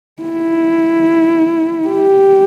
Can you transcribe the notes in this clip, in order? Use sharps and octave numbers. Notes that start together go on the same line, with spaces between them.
E4
G4